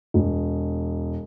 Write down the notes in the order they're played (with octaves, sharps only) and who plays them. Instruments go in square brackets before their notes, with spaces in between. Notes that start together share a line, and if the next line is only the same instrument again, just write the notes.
[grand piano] E1